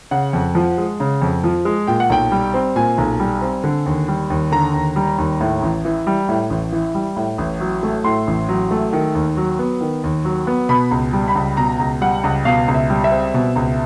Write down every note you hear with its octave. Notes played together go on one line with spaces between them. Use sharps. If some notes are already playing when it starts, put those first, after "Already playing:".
C#3 F#5
F2
F3
G#3
C#3
F2
F3
G#3
A#2 G5
F#5
B1 G5
G3
C4
A#2 G#5
B1
G3
C4
D3
D#2
G3
D#2
D3 A#5
D#2
G3
D#2
A2
A1
E3
G3
A2
A1
E3
G3
A2
A1
F#3
A3
A2 C6
A1
F#3
A3
D#3
D#2
F#3
B3
D#3
D#2
F#3
B3
B2 B5
C#2
G3
B5
C#2
B2 A#5
C#2
G3 F#5
C#2
B2 F5
C#2
E5
G3
E5
C4
B2
C#2